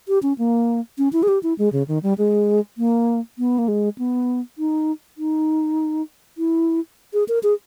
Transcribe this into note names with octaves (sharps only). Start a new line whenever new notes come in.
G4
C#4
A#3
C#4
E4
G#4
G4
E4
G#3
C#3
D#3
G3
G#3
A#3
B3
A#3
G#3
B3
D#4
D#4
E4
G#4
A#4
G#4